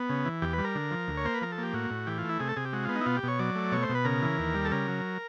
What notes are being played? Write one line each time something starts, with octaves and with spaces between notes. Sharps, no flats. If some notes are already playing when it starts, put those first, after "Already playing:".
Already playing: B3
C#3
E3
E2 G4
G3 B4
A#4
D3
F3
D2
C#5
A#3 C5
B4
F3 A#4
A4
A#3 G4
A2 F#4
A2
E3 G4
F4
A3
E4
C3 G#4
A4
C3 G#4
G4
G#3 F#4
B3 F4
D#4
E4
B2 F4
G4
B2 C#5
F#3 D5
A3
B2 C#5
C5
B2
B4
C#3 A#4
E3
D#2
G3
A4
C#3 A#4
F#3